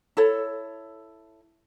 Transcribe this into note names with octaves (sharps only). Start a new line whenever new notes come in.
E4 A4 C#5